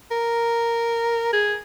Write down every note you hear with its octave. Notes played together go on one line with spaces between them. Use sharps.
A#4
G#4